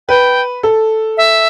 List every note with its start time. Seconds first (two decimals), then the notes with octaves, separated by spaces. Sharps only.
0.08 B4 G5
0.63 A4
1.17 E5